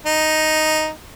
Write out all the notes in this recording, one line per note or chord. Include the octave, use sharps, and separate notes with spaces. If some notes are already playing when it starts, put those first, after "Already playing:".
D#4